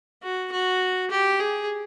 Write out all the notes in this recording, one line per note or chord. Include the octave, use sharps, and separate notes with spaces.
F#4
F#4
G4
G#4